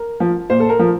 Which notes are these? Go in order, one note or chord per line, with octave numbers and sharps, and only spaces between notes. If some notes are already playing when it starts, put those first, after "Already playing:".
Already playing: A#4
F3
A#2 C5
A4
A#4
F3